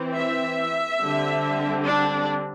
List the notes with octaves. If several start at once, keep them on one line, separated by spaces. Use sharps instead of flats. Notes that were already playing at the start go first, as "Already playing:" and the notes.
Already playing: E3 C4
E5
D3 G3 C4
D4